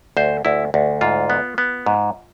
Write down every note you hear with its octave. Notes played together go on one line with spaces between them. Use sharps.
D2 C5
D2 E4
D2
G#2 F4
B3
B3
G#2